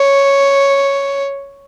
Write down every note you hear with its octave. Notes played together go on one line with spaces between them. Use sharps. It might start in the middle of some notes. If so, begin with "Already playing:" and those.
Already playing: C#5